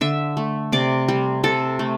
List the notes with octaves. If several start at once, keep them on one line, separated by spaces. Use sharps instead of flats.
D3 E5
A3
C3 D5
G3
C3 A4
A3